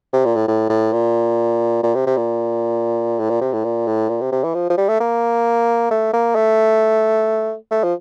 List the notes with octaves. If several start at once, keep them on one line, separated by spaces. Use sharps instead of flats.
C3
A#2
A2
A2
A2
A#2
A#2
C3
C3
A#2
A2
A#2
C3
A2
A#2
A2
A#2
C3
C3
E3
F3
F3
G3
A3
A#3
A3
A#3
A3
A3
F3